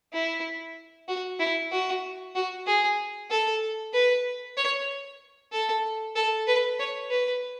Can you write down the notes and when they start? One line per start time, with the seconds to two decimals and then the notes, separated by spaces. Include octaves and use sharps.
0.13 E4
1.08 F#4
1.40 E4
1.72 F#4
2.35 F#4
2.67 G#4
3.31 A4
3.93 B4
4.57 C#5
5.52 A4
6.16 A4
6.47 B4
6.79 C#5
7.10 B4